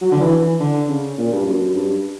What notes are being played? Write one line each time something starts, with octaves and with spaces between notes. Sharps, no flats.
F#3
D3
E3
E3
D3
C#3
A#2
G2
F#2
F#2
G2